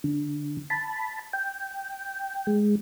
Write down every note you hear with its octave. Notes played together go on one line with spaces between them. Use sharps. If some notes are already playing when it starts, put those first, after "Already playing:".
D3
A5 B5
G5
G#3